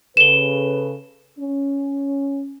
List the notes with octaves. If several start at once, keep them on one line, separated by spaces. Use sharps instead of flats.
C#3 A4 B4 E7 G7
C#4